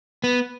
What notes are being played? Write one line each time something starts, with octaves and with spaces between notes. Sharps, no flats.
B3